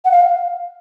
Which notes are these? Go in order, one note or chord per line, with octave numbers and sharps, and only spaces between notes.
F#5
F5